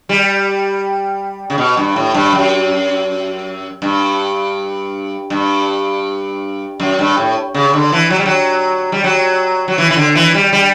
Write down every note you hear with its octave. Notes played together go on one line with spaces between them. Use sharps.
G3
C#3
B2
G2
A2
G2
F#2
G2
G2
F#2
G2
A2
C#3
D3
E3
F#3
G3
F#3
G3
F#3
F#3
E3
E3
D3
E3
G3
G3